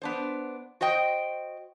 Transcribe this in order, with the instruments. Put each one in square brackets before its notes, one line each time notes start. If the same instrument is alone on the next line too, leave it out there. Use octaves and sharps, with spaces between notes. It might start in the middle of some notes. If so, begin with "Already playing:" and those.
[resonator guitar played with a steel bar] B3 D4 C5
F#4 C5 D#5 G5